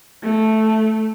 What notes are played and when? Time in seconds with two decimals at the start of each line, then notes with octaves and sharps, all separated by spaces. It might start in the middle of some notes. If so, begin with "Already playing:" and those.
0.24 A3